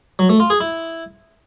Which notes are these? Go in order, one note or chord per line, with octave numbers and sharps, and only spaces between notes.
F#3
A3
F4
G#4
E4